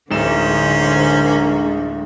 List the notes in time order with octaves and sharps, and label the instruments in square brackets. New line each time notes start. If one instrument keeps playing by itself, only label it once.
[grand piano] D1 D#4 E7 [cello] D3 [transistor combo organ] G#3 [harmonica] A#3 C#4 C5